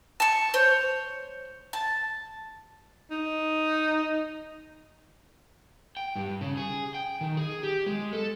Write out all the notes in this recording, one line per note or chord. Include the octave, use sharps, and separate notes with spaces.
A5 C#6
C5 C#5
A5
D#4
G5
G2
C#3
G#4
G5
D#3
G#4
G4
G#3
A4